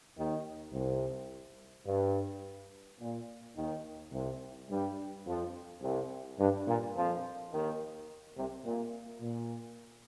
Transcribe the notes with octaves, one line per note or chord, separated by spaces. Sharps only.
D#2 D#3
C2 C3
G2
A#2
D#2 D#3
C2 C3
G2 G3
F2 F3
C2 C3
G2
A#2
F2 F3
D#2 D#3
C2 C3
A#2
A#2